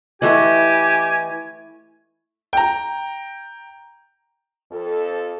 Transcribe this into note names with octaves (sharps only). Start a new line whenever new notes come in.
E3 A3 E4 G4 D#5 F#5 G#5
G5 A#5
F2 A4